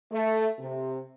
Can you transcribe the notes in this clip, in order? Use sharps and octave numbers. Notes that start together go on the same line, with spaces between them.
A3
C3